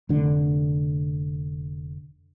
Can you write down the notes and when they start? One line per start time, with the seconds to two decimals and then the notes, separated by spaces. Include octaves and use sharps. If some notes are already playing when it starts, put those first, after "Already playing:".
0.09 F1 D3